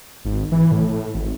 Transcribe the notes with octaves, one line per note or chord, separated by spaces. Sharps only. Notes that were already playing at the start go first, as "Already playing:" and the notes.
G#1
E3
A2
A2
G#1